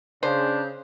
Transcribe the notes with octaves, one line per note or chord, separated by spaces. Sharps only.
C#3 D4 C5